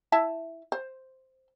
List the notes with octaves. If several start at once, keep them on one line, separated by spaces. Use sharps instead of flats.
E4 E5 A5
C5